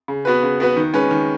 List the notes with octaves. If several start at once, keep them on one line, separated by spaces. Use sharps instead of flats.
C#3
B3 F#4 B4
C#3
B3 F#4 B4
D#3
G#3 C#4 B4
D#3